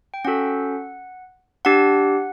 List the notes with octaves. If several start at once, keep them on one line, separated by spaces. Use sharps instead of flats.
G5
C#4 F#4 A4 F#5
D4 G4 F#5